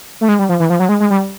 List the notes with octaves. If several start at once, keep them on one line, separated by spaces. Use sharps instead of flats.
A3
G#3
G3
F3
E3
F3
F#3
G#3
G#3
G3